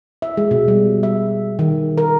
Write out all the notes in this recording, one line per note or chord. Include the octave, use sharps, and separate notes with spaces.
E5
G#3
B2
G3
E5
D#3
A#4